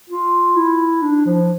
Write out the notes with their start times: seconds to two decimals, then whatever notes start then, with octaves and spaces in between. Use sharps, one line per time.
0.09 F4
0.56 E4
1.02 D4
1.26 F3